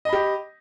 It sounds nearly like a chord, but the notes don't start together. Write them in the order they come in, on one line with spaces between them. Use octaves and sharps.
D#5 B5 G4